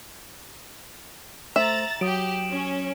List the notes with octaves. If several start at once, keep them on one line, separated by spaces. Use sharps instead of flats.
A3 C5 E5 A#5 A6 E7 F#7
F#3 G4 D#6 D7
C#4